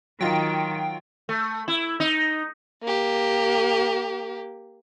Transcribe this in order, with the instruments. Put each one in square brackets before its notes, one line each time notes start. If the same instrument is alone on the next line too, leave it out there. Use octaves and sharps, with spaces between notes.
[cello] D#3 [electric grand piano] F#3 F4 D#5 [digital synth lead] G5
[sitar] A3
E4
D#4
[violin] A#3 G4